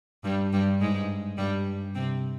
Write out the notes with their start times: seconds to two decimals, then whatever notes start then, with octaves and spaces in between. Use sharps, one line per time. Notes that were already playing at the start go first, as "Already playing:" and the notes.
0.24 G2 G3
0.53 G2 G3
0.81 G#2 G#3
1.38 G2 G3
1.95 C3 C4